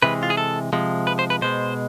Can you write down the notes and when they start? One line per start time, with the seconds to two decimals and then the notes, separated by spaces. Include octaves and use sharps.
0.02 C3 E3 G#3 B4
0.23 F4
0.30 G#4
0.37 A4
0.73 C3 F3 G#3
1.07 B4
1.19 C5
1.30 B4
1.42 B2 G#3 C5